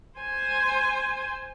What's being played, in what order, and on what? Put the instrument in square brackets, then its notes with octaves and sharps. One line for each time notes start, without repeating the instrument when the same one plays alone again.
[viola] C5 G#5